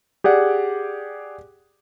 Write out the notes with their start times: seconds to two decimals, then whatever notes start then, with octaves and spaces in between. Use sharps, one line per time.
0.24 G4 G#4 D5 F#5